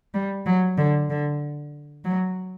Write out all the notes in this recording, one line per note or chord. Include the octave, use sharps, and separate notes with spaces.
G3
F#3
D3
D3
F#3